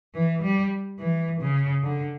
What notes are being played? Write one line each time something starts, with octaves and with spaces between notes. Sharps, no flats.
E3
G3
E3
C#3
D3